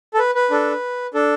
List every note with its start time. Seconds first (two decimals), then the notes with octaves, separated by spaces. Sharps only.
0.14 A4
0.19 B4
0.35 B4
0.51 D4 A4
1.14 D4 A4